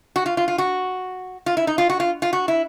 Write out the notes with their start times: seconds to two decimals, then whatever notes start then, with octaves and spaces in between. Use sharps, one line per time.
0.16 F#4
0.26 F4
0.37 F4
0.48 F4
0.58 F#4
1.46 F4
1.57 E4
1.67 D#4
1.78 F4
1.90 F#4
2.00 F4
2.22 F4
2.33 F#4
2.48 E4